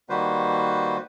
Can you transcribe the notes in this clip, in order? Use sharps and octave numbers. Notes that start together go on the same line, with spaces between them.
D#3 G3 A#3 F#4 B4 C5